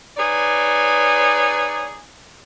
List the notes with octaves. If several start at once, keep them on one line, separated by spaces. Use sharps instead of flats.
D#4 G#4 B4 C#5 D5